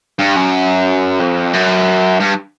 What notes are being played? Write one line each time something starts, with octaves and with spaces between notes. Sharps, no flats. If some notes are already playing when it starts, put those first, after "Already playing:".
G2
F#2
F2
F#2
G2